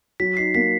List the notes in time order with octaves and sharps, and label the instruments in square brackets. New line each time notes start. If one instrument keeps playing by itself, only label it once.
[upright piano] F#3 [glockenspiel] B6
[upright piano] D#4 [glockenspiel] C7
[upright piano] A#3 [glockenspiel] B6